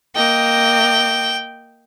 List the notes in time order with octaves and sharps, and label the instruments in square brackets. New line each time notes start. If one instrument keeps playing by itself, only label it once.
[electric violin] A#3 D#5 [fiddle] G5